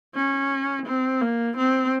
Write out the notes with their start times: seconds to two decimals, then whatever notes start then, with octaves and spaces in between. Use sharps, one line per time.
0.15 C#4
0.86 C4
1.21 A#3
1.57 C4